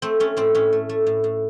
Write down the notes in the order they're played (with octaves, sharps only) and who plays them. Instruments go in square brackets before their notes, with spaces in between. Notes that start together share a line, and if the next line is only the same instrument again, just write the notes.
[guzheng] A3 C4
A3 C#4
A2 C4
A2 C#4
A3
A3
A2
A2